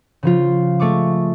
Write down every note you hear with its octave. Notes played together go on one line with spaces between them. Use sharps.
C#3 F3 F4
G#3 A3 C#6 D6